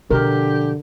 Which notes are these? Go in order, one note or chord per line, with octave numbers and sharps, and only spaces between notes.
B2 D3 F3 G4 A#4